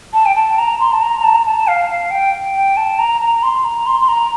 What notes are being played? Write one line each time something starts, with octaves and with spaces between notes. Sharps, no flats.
A5
G5
A5
A#5
C6
A5
A#5
A#5
A5
A#5
A5
F5
F5
G5
G5
A5
A#5
A#5
A#5
C6
A#5
C6
C6
A#5